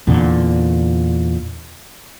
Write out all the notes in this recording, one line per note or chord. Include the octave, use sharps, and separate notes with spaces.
E2 A#2 D3